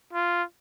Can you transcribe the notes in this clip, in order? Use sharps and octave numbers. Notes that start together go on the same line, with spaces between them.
F4